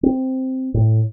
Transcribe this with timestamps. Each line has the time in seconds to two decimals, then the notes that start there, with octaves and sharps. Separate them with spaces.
0.03 C4
0.74 A2